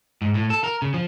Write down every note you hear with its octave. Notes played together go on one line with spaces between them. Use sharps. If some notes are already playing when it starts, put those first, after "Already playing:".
G#2
A2
A4
A#4
C#3
F3